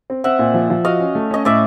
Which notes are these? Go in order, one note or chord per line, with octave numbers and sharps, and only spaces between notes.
C4
C4 E5 F#5
A#2
F3
F3
F#4 D#5 F5
C#4
A3
C#4 D#5
A2 D5 E5